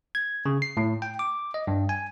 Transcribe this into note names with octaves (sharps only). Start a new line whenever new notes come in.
G#6
C#3
C7
A2
G5
D6
D#5
G2
G#5